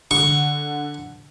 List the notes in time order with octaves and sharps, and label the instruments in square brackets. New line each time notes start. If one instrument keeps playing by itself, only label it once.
[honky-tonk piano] D3 [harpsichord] C#6